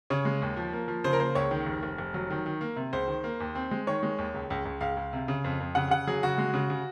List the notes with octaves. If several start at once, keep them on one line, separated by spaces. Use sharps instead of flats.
C#3 C#5
G#3
D#2
F3
A#3
F3
C#3 C5
A#4
A#3 C5
C#2 C#5
D#3
F1
F1
F1
F#3
D#3
D#3
A#3
C3
C#2 C5
D#3
A#3
D#2
C4
G#3
D#3 C#5
G#3
D#2
C#2
C#2
C#2
C#2 F5
C#2
C3
C#3
F2
F2
C#3 F#5
C#3 F#5
F#3 G#4
C#3 F#4
G#3
C#3
C#3